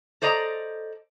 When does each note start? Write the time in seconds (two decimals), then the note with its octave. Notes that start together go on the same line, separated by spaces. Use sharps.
0.22 A4 C5 D5 D#5 A#5